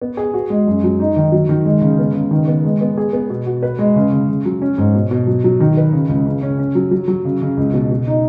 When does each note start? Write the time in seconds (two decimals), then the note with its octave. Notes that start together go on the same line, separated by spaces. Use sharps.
0.01 B3
0.17 G#4
0.34 F#4
0.50 G#3
0.67 F#2
0.84 F#3
1.00 D#4
1.16 D#3
1.32 F#3
1.49 D#3
1.65 G#3
1.81 C#3
1.99 B3
2.14 C#3
2.31 D#3
2.47 B3
2.64 G#3
2.81 B3
2.97 G#4
3.13 B3
3.30 B2
3.46 F#4
3.63 B4
3.79 G#3
3.96 C#3
4.12 C#3
4.29 C#3
4.45 F#3
4.62 C#4
4.78 G#2
4.95 B2
5.11 B2
5.27 F#3
5.44 F#3
5.60 D#3
5.77 B4
5.93 C#3
6.09 C#2
6.26 C#3
6.43 C#4
6.59 C#4
6.75 F#3
6.91 F#3
7.08 F#3
7.25 C#3
7.42 C#3
7.57 C#2
7.74 B2
7.91 B2
8.07 D#4